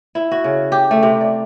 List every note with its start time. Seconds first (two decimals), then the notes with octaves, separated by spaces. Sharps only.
0.15 E4
0.31 F#4
0.44 C#3
0.72 G4
0.91 A3
1.03 C3
1.21 D5